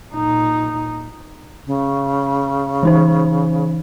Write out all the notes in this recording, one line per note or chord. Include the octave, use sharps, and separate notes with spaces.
A#2 D#4
C#3
E3 D#4 C5